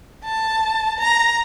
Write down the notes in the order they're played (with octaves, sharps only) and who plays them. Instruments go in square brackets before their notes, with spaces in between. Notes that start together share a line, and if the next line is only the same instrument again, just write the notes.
[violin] A5
A#5